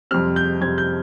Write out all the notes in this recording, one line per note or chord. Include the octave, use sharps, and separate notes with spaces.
F2 C3 G3 C4 F6
G6
F2 C3 G3 C4 G#6
G6